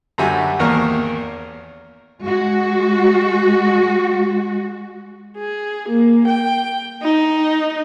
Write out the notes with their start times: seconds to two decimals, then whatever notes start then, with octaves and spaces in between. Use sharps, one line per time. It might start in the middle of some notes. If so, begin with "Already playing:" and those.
0.18 F#2 D3 G3 F#4 E5 G#5
0.59 G#1 E2 A#3 A#4 F5 C#6
2.22 G#3 F#4
5.37 G#4
5.89 A#3
6.27 G5
7.03 D#4